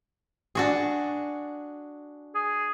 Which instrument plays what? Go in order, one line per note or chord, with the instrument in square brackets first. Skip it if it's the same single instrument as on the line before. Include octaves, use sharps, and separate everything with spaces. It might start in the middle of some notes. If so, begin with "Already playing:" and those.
[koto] D4 F#4 G#4
[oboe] G#4